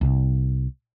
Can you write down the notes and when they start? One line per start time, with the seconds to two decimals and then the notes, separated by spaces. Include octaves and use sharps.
0.01 C2